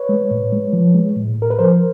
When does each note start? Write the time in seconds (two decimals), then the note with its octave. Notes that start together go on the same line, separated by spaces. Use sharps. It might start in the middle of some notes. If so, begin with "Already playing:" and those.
Already playing: B4 C#5
0.09 G#3
0.31 A2
0.52 G#3
0.73 F3
0.94 G#3
1.16 A2
1.38 A2 A#4
1.50 B4
1.59 F3 A#4 C5